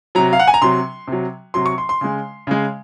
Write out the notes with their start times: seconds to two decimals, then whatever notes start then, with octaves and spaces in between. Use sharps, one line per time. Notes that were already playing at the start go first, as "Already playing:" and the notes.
0.15 C3 F#3 A#5
0.33 F5
0.40 F#5
0.47 G#5
0.54 A#5
0.62 C3 F#3 C6
1.08 C3 F#3
1.54 C3 F#3 C6
1.66 C#6
1.78 C6
1.89 C6
2.01 C#3 G#3
2.47 C#3 G#3